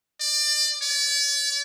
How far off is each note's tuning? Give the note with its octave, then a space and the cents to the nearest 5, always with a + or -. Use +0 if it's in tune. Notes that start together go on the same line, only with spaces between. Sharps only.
D5 +25
D5 -45